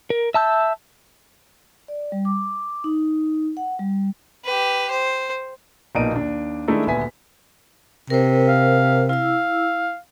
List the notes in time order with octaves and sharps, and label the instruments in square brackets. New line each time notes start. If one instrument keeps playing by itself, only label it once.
[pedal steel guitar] A#4
E5 A5 E6 G6
[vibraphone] D5
G3
D6
D#4
F#5
G3
[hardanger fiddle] G4 B4
C5
[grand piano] A#1 B2 A#3 D#4 D7 D#7
D#2 D4
D#3 G#3 A3 D4 E4
D#1 D2 B3 E5 G#5 B6
[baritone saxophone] C3 [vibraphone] A#4 C5
[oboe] F5
[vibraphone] E4 E6 [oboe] F5